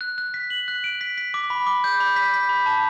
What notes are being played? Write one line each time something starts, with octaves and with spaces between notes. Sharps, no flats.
F#6
F#6
B6
F#7
F#6
D7
B6
B6
D6
B5
D6
G6
B5
B6
B6
B5
A5